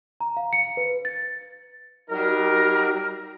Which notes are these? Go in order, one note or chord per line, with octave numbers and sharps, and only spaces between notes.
A#5
F5
C#7
B4
A6
F#3 G3 D#4 A#4